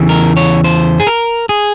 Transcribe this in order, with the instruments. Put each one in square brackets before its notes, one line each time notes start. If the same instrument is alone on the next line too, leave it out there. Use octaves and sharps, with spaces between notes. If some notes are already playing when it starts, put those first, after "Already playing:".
Already playing: [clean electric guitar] E2 C#3 E3
A#4
C#5
C5
G#4
A#4
G#4